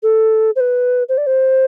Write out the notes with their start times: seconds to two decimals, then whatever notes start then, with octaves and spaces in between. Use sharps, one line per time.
0.03 A4
0.56 C5
0.60 B4
1.09 C5
1.18 D5
1.27 C5